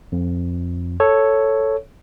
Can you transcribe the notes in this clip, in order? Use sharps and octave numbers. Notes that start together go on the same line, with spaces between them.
F2
A4 C#5